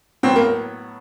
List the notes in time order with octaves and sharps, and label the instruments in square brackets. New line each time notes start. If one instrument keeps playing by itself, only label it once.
[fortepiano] A2 F#3 B3 [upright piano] C4
[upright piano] A#3